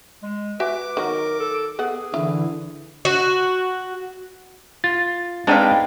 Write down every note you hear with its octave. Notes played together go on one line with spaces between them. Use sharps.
G#3
F#4 B4 E5 G#5 D6
D#3 F#3 A#4
A4
B3 G#4 A4 F#5
D3 E3 E4
F#4
F4 A6
G#3 C4 D4 D#4 B4 F5 G5 D6